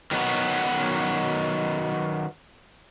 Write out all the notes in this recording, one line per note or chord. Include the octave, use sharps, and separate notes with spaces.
D#3 F#3 B3 F#4